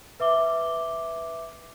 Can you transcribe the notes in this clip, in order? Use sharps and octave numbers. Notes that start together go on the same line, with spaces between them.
B4 E5 D6 G7